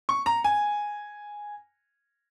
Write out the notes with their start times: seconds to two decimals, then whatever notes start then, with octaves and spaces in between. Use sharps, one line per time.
0.09 C#6
0.26 A#5
0.44 G#5